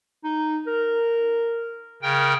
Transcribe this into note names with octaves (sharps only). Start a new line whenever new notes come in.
D#4
A#4
C#3 A#4 G5